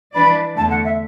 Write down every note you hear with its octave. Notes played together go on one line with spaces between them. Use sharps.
E3 D4 B4 D5 B5
E2 D3 A3 A5
F#5
E5